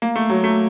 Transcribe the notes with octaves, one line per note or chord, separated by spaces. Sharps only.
A#3
A3
F#3
A3